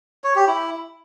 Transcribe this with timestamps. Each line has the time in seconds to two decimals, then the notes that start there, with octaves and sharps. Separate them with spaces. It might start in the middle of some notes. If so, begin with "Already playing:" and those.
0.24 C#5
0.36 G4
0.47 E4